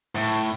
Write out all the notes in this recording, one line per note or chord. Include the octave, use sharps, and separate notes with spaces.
A2